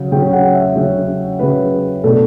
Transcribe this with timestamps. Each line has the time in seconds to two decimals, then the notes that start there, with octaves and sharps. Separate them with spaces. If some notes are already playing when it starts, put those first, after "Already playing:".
Already playing: C#3 F#3
0.12 C#3 F#3 C#4 G5
0.33 F#5
0.55 E5
0.75 C#3 F#3 C#4
1.39 C#3 F#3 C#4 B4
2.04 B2 A3 D4 A4